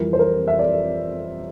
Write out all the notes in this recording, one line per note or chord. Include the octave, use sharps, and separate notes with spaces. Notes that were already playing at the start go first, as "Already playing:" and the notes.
Already playing: F2 E3 G3 A#4
C5
A#4
E5
D5